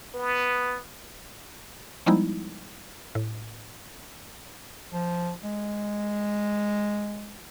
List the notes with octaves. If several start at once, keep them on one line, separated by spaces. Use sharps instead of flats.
B3
F3 G3 G#3 B3 D#4 E4
A2
F3
G#3